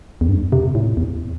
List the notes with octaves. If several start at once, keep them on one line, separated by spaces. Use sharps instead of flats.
E2
G2
C3
A2
E2